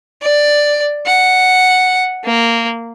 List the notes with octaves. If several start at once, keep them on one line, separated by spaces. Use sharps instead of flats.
D5
F#5
A#3